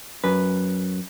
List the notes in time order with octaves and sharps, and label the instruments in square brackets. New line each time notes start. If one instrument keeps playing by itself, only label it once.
[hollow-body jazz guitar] F#2 B4